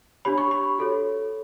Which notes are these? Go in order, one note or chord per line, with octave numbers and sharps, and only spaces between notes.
D4 G4 C#5 B5
C#6
B5
F#4 A4 C#5